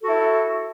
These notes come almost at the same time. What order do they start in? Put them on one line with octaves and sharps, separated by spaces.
A4 F#4 E4